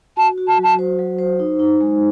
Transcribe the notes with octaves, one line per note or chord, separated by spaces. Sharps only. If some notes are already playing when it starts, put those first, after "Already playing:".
F#4 A5
F#4
A5
F#3
A5
C5
F#3
C5
D#4
D#4
G#3